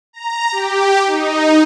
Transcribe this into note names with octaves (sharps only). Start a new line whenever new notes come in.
A#5
G4
D#4